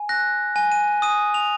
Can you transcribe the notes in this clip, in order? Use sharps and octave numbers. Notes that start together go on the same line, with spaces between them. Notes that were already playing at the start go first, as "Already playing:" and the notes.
Already playing: G#5
F#6 A#6
G#5
D#7
D#6 D#7
F7